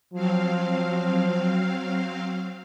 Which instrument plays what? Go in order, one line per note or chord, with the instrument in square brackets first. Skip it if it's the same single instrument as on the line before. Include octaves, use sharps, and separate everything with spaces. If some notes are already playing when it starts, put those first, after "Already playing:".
[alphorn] F3 [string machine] F#3 C4 F5